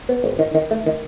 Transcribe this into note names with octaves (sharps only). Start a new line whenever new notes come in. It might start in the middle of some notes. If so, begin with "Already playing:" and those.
B3
G#1
D#3
D#3
A3
D#3